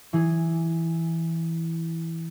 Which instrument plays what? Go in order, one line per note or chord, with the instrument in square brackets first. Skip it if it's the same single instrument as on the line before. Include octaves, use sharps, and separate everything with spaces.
[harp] E3 G#4